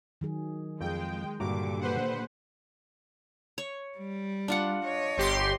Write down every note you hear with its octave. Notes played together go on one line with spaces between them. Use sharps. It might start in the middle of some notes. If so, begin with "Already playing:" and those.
D#3 F#3 G#4
F2 G#3 G5
G2 A#2 D3 F#4 G4 A#5 D6
B4 C5 F#5
C#5
G3
D4 F4 F#5
C#5 D#5
G1 G4 C6